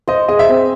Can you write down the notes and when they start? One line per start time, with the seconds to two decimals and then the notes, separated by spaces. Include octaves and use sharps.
0.08 C5 D#5
0.28 G#4 D#5
0.39 E5
0.49 C4